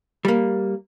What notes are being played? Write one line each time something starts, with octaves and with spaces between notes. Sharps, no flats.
G3 A#3